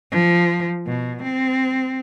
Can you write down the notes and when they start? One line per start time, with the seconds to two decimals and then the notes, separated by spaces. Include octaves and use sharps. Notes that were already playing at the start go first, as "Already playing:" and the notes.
0.11 F3
0.86 B2
1.22 C4